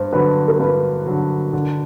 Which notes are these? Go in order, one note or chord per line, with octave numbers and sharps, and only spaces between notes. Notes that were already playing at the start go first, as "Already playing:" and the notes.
Already playing: G2 C5
D3 F#3 B4
A#4
G2 B4
D3 F#3
D3